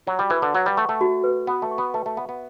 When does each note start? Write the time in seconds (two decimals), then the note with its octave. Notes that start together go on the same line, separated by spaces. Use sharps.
0.07 F#3 F#4
0.19 G3
0.30 E3 B4
0.42 D3
0.55 F#3 F#5
0.66 G3
0.77 A3 C#6
0.89 A3
1.01 F#4
1.24 B4
1.47 B3 F#5
1.62 A3
1.71 C#6
1.78 B3
1.94 A3 B4
2.06 A3
2.17 B3 E5
2.29 B3